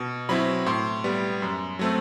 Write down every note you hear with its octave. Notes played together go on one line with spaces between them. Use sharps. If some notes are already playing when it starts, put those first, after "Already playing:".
Already playing: B2
F#3 C4 E4 B5
A2 C6
G3 B3
F#2
F#3 A3 C4